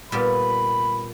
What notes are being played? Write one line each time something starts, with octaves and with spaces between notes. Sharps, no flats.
A#2 G3 B3 B5